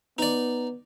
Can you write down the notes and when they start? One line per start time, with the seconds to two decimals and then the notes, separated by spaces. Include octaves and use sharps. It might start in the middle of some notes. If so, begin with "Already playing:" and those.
0.18 B3 D#4 D5